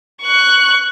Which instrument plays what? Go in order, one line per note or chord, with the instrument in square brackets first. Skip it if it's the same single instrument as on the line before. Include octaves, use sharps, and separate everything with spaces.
[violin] C#6 F#6